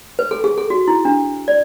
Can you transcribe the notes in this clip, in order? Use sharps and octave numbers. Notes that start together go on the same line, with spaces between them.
B4
A4
G#4
A4
F#4
E4
D4
D5